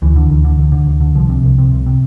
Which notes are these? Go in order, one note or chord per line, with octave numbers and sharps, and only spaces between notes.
D2 E3
D3
D2
D3
D2
D3
D2
D3
C2 F3
C3
C2
C3
C2
C3